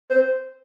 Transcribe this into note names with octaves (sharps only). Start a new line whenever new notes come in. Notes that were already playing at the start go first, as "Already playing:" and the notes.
C5